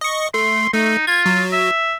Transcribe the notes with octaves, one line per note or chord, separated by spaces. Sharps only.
D#5 C#6
A3 C6
A3 D#4
F4 G#6
F#3
E5